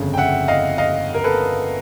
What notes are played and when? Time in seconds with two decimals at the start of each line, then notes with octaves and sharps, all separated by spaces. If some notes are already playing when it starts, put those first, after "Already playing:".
Already playing: G1 F2 C#3
0.14 G5
0.17 E5 F#5
0.48 D#5 F5
0.78 D#5 F5
1.14 A#4
1.24 A4 B4